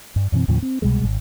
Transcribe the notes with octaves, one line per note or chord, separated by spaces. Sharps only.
G2
F#2 B2 E3 C4
D#2 A2 C#3 F3
C4
C2 B2 G3 G#3
G#1